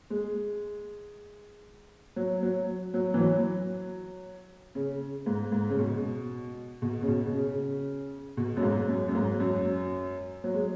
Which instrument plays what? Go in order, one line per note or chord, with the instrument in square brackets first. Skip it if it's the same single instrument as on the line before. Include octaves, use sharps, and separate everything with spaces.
[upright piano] G#3
F#3
F#3
F#3
E3
F#3
C#3
G#2
G#2
C#3
B2
B2
C#3
B2
C#3
B2
F#2
G#2
F#2
F#2
G#2
F#2
F#3
G#3